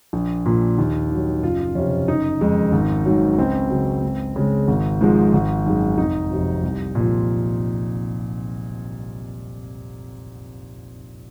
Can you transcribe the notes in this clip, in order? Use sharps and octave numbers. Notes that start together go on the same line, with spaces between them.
A#1
A#2 F3
D#2
D#3 F#3
F#1 F4
F2 C3 C#4
F#1 D#4
F2 D#3 G#3
G#1
G#2 D#3 F#3
C#2 C4
C#3 F#3
C#2
C#3 G#3
G#1
G#2 F3 G#3
G#1
F#2 D#3 G#3
F1 D#4
F2 C3 F#3
C2
A#2
F3